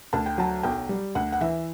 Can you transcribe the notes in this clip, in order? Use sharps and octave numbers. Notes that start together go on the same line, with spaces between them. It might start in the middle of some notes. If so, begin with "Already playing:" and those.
D2 A5
G5
F#3 A5
B1 G5
G3
D2 F#5
F#5
E3 E5